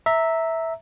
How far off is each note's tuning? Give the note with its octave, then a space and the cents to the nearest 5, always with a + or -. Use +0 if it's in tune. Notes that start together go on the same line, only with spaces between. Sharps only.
E5 -10 A#5 -15